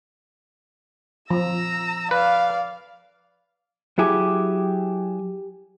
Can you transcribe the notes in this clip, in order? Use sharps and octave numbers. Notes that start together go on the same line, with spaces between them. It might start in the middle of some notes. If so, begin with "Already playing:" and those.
F3 A#5 E6
B4 D5 F5
F#3 E4 G4 G#4